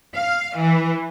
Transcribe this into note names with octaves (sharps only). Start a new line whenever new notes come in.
F5
E3